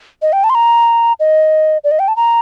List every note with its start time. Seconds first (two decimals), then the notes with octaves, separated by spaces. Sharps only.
0.22 D#5
0.33 G5
0.44 A5
0.50 C6
0.55 A#5
1.20 D#5
1.84 D5
1.91 D#5
1.99 G5
2.08 A5
2.16 A#5